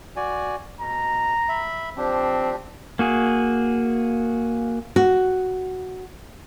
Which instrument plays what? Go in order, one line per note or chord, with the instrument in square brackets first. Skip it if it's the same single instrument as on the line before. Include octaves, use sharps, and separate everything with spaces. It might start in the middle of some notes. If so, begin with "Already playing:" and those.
[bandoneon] F#4 D5 G#5
[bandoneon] B2 [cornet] A#5
[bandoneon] E5 B5
[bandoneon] F3 D4 G4 [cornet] C4
[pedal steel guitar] A#3 F#4 G#4
[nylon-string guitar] F#4